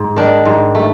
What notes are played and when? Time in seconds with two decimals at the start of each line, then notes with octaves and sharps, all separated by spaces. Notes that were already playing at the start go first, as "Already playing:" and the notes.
Already playing: G#2
0.16 D#3 D4
0.45 G#2
0.75 A3